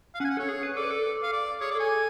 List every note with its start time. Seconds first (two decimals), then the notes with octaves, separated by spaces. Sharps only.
0.14 F5
0.20 C#4 F#5 G#5
0.30 F#5
0.37 A4 C#5
0.49 G#4
0.63 B4
0.76 A4 D5
0.84 B4
0.91 A4
1.23 F5
1.33 D5
1.61 G#4 C#5
1.71 D5
1.75 A4 G#5